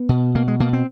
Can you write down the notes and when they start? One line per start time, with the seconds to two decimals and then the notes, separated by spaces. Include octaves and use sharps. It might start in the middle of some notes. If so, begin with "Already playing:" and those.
Already playing: B3
0.09 B2
0.35 B2 A#3
0.48 G#3
0.60 B2 A#3
0.73 C4